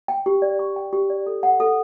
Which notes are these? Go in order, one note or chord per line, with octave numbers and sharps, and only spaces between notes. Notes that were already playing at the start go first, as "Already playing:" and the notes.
G5
G4
D5
C#6
G5
G4
D5
A4
F#5
A4